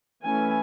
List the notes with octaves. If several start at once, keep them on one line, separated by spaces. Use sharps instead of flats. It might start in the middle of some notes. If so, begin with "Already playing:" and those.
E3 A3 C#4 G#5